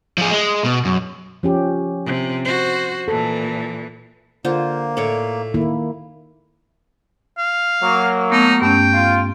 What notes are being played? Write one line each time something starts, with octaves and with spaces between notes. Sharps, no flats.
F3 G#4
G#3
B2
F#2
F3 C#4 G4
C3
F#4 C5
A#2 E3 A4
D3 A#3 F4 C5
A2 C#5 D5
D#3 A#3 E4
F5
F#3 A#3
A3 B3 D#4
G2 A3 C#4 G5
F4